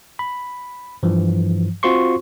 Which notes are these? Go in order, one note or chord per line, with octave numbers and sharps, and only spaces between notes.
B5
G2 E3 F3
C4 F4 F#4 C5 C6 C#6